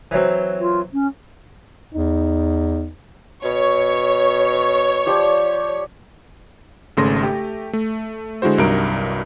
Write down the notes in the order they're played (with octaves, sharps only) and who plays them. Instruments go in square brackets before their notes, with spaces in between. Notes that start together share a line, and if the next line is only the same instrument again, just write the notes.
[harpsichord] E3 F#3 C4
[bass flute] F4
C#4
[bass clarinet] E2 [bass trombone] D#4
[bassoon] B2 [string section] C#5
[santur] F3 G4 D5
[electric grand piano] G#1 C#3 A3 C6 A#6
A3 G4
A3
D3 G#3 E4 F#4 C5
C2 G2 F#3 D#4 A#4 D7